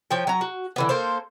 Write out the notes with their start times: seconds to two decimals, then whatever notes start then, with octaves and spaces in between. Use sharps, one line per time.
0.11 F3 C#5 G5
0.27 F#3 A#5
0.41 F#4
0.76 D3 E3 B3
0.89 A#3 A4 C5